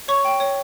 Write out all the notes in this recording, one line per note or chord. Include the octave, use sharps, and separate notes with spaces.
C#5 C#6
G5
C#5